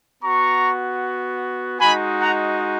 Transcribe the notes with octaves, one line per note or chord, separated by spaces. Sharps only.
B3 F#4 A#5 C#6
G#3 D#4 F#4 G#5 B5
F#5 A#5